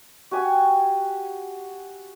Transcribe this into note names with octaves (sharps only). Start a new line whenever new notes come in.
F#4 G4 G#5